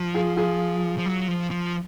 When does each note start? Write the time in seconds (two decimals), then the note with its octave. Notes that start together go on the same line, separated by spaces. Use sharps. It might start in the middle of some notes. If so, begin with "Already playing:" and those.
Already playing: F3
0.14 F4 G#4
0.36 F4 G#4
0.98 F3
1.06 F#3
1.28 F3
1.51 F3